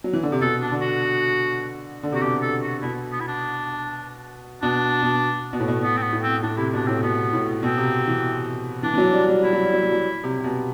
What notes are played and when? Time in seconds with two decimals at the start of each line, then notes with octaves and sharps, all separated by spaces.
0.04 F#3
0.13 E3
0.23 D3
0.32 C3
0.41 B2 A4
0.61 D4
0.71 D3
0.81 F#4
2.03 D3
2.12 C3 F#4
2.22 B2 G4
2.42 A4
2.62 F#4
2.82 B2 E4
3.12 B3
3.20 E4
3.27 D4
4.62 B2 D4
5.02 B2
5.53 B2
5.60 A2
5.68 B2
5.82 B2 B3
5.97 C4
6.02 B3
6.13 A2
6.22 C4
6.43 A2 D4
6.57 C3 E4
6.73 B2 D4
6.87 A2 C4
7.02 B2 B3
7.33 A2
7.63 B2 C4
7.78 C3
8.08 E3
8.83 E3 D4
8.94 E3
8.98 F#3
9.13 G3
9.28 G3
9.43 G3 E4
9.53 F#3
9.63 G3
9.74 F#3
9.83 G3
9.92 F#3
10.24 C3
10.39 C3
10.44 B2